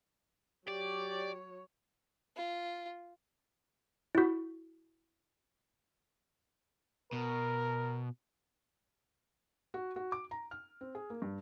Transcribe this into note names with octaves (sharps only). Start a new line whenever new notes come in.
F#3 G4 C#5 D5
F4
E4 F#4
B2 A#4
F#4
F#4
D6
A#5
F6
C4
G#4
A#3
G2